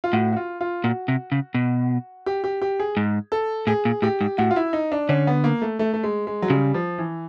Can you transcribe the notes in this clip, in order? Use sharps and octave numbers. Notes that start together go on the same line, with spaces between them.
F4
A2 F#4
F#4
F4
F4
A#2 F#4
C3
C#3
B2
G4
G4
G4
G#4
G#2
A4
A2 G#4
A#2
A2 G4
G#2
A2 F#4
F4
E4
D#4
D4
D3 C#4
B3
A#3
A3
A3
A3
G#3
G#3
F#3
C#3 G3
F3
E3